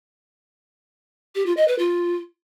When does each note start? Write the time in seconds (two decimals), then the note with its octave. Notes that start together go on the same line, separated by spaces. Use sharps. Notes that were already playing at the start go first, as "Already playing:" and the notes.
1.35 G4
1.46 F4
1.57 D#5
1.68 B4
1.79 F4